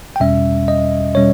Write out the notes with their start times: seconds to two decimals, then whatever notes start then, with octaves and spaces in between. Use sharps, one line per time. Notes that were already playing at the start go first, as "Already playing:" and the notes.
0.16 G5
0.20 E2 B2 G3 C#4 E5
0.68 D#5
1.15 B2 G3 C#4 C#5